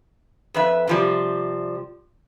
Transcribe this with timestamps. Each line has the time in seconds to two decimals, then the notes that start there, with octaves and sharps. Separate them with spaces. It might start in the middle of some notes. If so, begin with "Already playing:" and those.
0.54 F2 B4 E5
0.87 C3 F3 G3